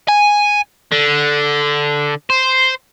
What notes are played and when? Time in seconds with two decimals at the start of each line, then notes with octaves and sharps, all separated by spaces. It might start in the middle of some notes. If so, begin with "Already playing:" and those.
0.09 G#5
0.92 D3
2.30 C5